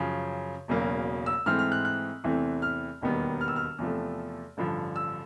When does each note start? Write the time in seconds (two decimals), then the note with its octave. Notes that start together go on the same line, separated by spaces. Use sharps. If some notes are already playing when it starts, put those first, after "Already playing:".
Already playing: F#2 C#3 F3
0.68 E1 E2 C#3 F#3 A#3
1.26 E6
1.46 G#2 E3 A3 C4 F6
1.59 F6
1.72 F#6
1.85 F#6
2.24 E2 C3 E3 A3 C4
2.62 F6
3.01 E1 D#2 D#3 G3 B3
3.41 F6
3.48 E6
3.56 F6
3.78 E2 C3 F3 A3
4.57 A1 G2 D3 F3
4.96 E6